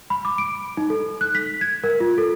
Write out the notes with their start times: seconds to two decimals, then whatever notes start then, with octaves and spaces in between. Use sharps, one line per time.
0.10 B5
0.25 D6
0.38 D7
0.77 D#4
0.90 A4
1.21 F#6
1.35 B6
1.61 G#6
1.84 A#4
2.00 F4
2.18 A4